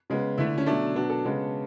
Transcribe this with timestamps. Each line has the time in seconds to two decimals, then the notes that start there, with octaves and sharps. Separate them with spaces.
0.10 C#3 G#3 B3
0.38 D3 A3 E4
0.58 C#4
0.66 B2 F#3 A3 D4
0.95 B2 F#3 B3 D4
1.10 A4
1.25 C#3 G#3 B3